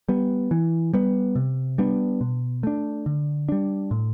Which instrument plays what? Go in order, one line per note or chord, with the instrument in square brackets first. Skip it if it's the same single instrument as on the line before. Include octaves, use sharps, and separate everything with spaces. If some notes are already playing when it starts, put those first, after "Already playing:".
[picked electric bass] G3 B3
E3
G3 B3
C3
G3 B3 D4
B2
A3 D4
D3
G3 D4
A2